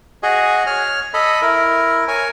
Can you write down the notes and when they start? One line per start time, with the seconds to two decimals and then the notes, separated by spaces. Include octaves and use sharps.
0.23 F#4 G#4 D#5
0.67 C#5 F6
1.14 A4 D#5 B5
1.42 E4 A#4
2.08 A#4 C#5 G#5